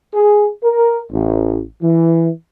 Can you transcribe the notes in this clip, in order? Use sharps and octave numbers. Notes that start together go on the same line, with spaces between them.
G#4
A#4
A1
E3